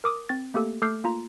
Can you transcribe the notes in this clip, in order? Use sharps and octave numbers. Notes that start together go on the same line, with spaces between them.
A#4 D6 D#6
C4 A6
A3 A#3 G4 A4
A3 A4 D6 F6 G6 C7
A#3 F4 A#5